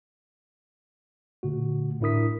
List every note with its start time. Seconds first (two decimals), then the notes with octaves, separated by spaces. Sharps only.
1.43 A#2 D3 A3 F#4
2.01 A2 D4 E4 A#4 D#6 B6